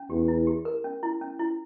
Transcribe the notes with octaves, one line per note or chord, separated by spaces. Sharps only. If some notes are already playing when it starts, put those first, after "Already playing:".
Already playing: C#4
E2 G4
E4
G4
A#4
C#4
E4
C#4
E4